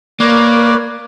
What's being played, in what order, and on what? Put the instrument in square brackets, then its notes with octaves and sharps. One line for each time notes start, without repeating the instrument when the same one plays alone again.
[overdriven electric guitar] A#3 [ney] A#4 [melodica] B4 C#5 D6 [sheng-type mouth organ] D5